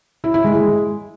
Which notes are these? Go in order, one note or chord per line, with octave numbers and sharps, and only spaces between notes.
E4
E4
G#3
G#3